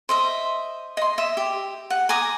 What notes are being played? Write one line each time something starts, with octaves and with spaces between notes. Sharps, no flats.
C5 D#5 E5
D#5 C6
E5 D#6
G4
F#5
G#5 A#5 D6 D#6